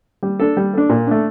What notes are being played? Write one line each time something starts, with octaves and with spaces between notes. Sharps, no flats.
G3
D4 A4
G3
D4 A4
A#2
A3 D4